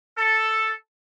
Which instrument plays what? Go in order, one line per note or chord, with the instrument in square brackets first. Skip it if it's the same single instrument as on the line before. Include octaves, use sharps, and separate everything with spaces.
[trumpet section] A4